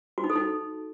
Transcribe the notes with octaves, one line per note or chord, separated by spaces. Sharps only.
F#4
D#4
A4
D#4